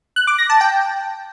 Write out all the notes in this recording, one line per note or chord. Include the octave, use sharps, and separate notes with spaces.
F#6
D6
A#6
A5
G5